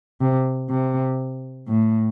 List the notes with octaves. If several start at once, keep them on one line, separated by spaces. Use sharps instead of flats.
C3
C3
A2